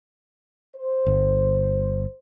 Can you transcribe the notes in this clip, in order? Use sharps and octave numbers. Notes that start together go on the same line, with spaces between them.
C5
G1